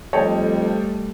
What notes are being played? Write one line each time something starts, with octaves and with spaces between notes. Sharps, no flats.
F2 G3 A3 C#5 D#5 G5 A5